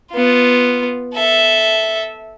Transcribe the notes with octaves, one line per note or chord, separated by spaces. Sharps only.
B3 F4
A4 E5